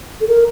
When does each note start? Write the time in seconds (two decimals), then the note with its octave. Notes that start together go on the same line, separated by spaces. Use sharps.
0.21 A4
0.28 A#4